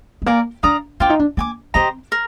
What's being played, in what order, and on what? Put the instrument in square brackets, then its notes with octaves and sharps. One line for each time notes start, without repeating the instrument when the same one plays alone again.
[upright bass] G#3
[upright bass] A#3 [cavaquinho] A#4 D5 G#5
[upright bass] D4 [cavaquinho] D5 F5 A#5 D#6
[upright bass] D4 [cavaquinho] F4 C5 G5 D6
[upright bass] D#4
D4
[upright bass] A#3 [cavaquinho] D5 G#5 D6
[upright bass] C4 [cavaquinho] G4 C5 D#5 A#5
[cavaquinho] A#4